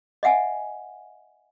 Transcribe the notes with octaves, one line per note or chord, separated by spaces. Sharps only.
D#5 E5 F#5 G#5